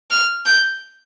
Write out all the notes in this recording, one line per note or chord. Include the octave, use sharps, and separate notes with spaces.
F6
G6